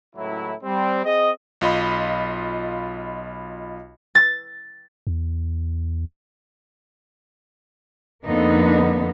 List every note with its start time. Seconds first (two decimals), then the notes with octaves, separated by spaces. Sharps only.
0.16 C#2 A2 F#3 E4
0.63 G3 C4
1.04 C4 G#4 D#5
1.61 B1 F4 D#5 B5
4.15 A6
5.07 E2
8.26 F2 D3 A#3 B3 D#4